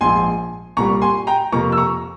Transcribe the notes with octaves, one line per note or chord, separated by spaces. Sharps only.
A#1 G#2 F3 G#5 C6
C2 A#2 G3 A#5 C#6
G#5 C6
G5 A#5
F2 C3 F3 A#3 A#5 C#6
E6
A#5 C#6